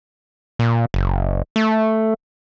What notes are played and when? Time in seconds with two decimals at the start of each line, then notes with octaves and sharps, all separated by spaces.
0.59 A#2
0.94 F#1
1.56 A3